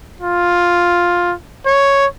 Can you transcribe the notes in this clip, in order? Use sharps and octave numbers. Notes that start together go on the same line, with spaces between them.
F4
C#5